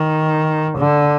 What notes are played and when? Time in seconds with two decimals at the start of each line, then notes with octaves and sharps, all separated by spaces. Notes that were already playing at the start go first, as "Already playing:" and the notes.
Already playing: D#3
0.78 D3